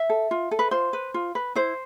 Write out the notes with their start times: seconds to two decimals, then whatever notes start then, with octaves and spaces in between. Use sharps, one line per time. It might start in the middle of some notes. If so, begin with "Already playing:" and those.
Already playing: E5
0.10 A4
0.31 F4
0.51 A4
0.59 B4
0.71 F4 C5
0.93 B4
1.14 F4
1.35 B4
1.55 E4 C5